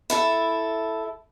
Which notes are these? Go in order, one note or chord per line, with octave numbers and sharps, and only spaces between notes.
E4 A4 E5